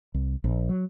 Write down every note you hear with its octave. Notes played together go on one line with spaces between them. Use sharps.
C2
A#1
F#3